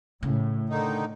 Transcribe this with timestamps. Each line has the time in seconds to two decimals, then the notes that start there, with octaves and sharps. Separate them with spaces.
0.23 A2 C#3
0.70 D3 D#3 D#4